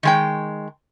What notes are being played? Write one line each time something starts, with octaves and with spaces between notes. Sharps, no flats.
D#3 G#3 G5